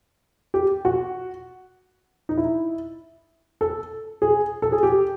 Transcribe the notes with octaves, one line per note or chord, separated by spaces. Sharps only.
G4
F#4
D#4
E4
A4
G#4
A4
G#4
G4